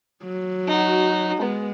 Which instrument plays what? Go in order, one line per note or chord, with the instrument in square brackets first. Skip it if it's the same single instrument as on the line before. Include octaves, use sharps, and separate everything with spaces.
[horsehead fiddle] F#3
[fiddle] D#4 F#4
[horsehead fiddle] G#3 [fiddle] B3